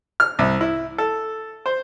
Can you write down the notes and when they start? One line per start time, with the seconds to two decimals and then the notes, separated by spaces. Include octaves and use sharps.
0.20 F6
0.39 C2
0.61 E4
0.98 A4
1.66 C5